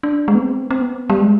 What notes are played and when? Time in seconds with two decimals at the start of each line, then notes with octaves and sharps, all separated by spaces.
0.03 D4
0.28 G#3
0.35 B3
0.42 C4
0.71 C4
0.82 B3
1.10 G3
1.21 G#3